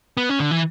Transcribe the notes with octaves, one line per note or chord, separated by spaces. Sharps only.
B3
C#4
D3
E3